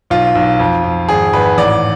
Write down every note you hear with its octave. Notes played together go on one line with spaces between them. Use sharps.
B1 F4
B1
F2
F2
G#1 G#4
G#1 B4
A1 D5